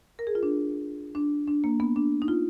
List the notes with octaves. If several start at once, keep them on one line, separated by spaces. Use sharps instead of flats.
A#4
G#4
F4
D4
D4
D4
A#3
B3
D4
D#4
F4